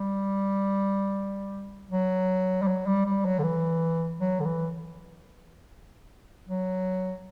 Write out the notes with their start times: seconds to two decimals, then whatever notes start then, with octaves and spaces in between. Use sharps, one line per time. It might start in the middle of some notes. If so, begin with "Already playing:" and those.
Already playing: G3
1.91 F#3
2.62 G3
2.67 F#3
2.87 G3
3.06 G3
3.25 F#3
3.39 D3
3.43 E3
4.20 F#3
4.40 D3
4.45 E3
6.48 F#3